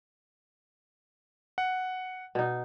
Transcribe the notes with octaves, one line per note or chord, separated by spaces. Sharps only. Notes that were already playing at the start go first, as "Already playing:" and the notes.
F#5
B2 D#4